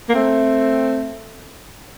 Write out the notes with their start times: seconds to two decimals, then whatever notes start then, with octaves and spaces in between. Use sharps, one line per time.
0.09 A#3
0.15 A3 C4